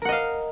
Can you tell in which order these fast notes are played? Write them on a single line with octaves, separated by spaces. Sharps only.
A#4 F#5 D#5 F5